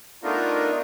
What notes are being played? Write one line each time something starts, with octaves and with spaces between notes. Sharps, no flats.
A3 B3 D4 D#4 F4 A#4